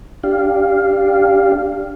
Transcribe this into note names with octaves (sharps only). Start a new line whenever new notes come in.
D4 G4 F5